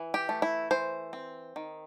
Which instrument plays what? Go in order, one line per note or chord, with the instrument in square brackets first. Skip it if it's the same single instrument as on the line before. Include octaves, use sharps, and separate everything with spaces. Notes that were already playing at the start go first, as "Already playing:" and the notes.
Already playing: [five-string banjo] E3
G4
A3
E4
E3 C5
C4
D#3